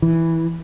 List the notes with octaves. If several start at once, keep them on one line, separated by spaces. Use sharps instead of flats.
E3